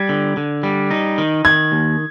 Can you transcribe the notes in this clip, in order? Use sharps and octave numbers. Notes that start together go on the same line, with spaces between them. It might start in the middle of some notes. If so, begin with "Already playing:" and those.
Already playing: G3 G#6
D3
D3
G3
D#4
D#3
D#3 G#6
D#2